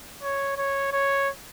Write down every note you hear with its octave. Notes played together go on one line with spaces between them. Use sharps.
C#5
C#5
C#5